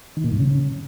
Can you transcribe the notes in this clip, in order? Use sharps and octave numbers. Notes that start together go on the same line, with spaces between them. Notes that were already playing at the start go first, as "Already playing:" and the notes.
D#3
A#2
G2
C#3